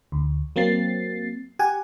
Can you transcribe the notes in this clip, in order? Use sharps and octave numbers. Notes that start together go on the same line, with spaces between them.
D2
F#3 A#3 C4 A6 C7
G4 F#5 G#5